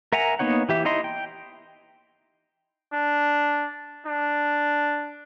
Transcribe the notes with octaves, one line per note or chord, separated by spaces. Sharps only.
A#4 E5 F#5 G#5 A#5
A#3 B3 D#4 C#5 F#5
E3 G4 E5
D#4 E4 D#5 C6
G5
D4
D4